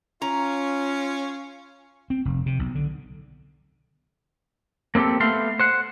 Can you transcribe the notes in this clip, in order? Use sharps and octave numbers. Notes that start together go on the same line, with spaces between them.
C#4 F4 A#5
C4
F1
C3
B1
D3
A#3 C4 D4 G4 A4
A3 B3 F5 C6
C5 F#5